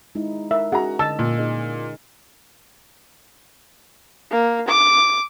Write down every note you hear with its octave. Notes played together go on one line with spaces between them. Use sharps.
G#3 D#4 E4
A#4 E5
C#4 F#4 G#4 A#5
D3 D#5 A5 E6
A#2
D#4 G#4 D#5
A#3
D6